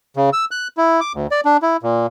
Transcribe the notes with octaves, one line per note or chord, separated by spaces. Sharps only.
C#3
E6
F#6
E4
D6
D2
D5
D4
E4
A#2